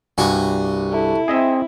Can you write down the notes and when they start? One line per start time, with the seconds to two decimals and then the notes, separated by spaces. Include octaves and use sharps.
0.18 C2 G2 F#4 G#5
0.92 E4 A4
1.28 C4 G#4 D#5 E5